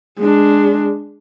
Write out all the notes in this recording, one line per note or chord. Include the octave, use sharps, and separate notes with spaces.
G#3 D4